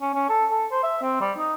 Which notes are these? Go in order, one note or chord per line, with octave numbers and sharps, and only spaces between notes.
C#4
C#4
A4
A4
C5
E5
C4
G3
D#4